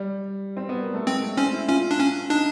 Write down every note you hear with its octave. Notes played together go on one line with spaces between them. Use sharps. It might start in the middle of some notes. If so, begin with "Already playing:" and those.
Already playing: G3
C4
B3
A#3
A3
G#3 C4
A3
C4 C#4
E4
C#4 F4
D4
C#4
D4 D#4